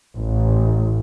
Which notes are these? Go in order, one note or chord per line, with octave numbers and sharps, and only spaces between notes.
A1